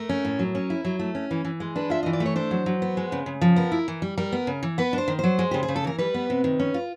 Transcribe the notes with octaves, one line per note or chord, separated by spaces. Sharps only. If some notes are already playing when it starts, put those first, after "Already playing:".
Already playing: A3 A#4
C#4
A2
F#3
C#4
E4
F#3
A3
C#4
E3
E3
G#3
D4 B4
F4 E5
E3 D#5
D5
A3
C#5
D4 C5
F#3
F#3
B3
G#3
C#3
C#3
F3
B3 A#4
E4
E3
G3
G3 A#4
B3
C#3
E3
B3 B4
D4
C5
D#3
F#3 C5
G#3
C#3 G4
G#4
C#3
A4
E3 A#4
G3 B4
B3
C3
D#3
C#4
F4